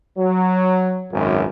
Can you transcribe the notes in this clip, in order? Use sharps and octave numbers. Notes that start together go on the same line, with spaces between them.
F#3
G#1 C#2 F#2